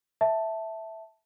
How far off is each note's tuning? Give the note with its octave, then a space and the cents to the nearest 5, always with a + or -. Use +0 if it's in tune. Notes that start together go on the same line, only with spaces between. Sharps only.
E5 -5 A5 +0